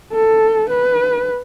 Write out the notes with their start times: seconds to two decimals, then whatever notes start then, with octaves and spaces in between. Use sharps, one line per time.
0.13 A4
0.69 B4